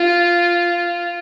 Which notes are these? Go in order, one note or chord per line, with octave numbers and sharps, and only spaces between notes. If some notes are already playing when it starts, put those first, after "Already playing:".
Already playing: F4